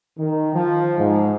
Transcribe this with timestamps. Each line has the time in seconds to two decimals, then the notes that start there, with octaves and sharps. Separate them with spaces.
0.18 D#3
0.55 F3
0.98 G#2